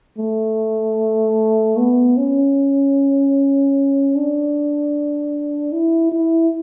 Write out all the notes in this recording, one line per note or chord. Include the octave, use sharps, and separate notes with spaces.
A3
B3
C#4
D4
E4
E4